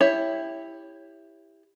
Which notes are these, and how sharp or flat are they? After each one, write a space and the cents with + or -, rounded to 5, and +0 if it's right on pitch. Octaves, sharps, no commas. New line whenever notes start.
E4 +0 G4 +15 C#5 +0